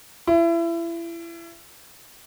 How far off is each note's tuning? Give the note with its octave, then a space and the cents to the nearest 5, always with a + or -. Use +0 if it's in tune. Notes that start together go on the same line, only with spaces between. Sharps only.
E4 +30